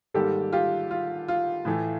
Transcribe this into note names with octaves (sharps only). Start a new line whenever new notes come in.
G#2 D#3 G3 A#3 G4 A4
F4 G4
F4
F4
A2 E3 A3